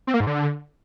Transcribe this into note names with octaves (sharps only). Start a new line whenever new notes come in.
C4
A#3
G#2
D3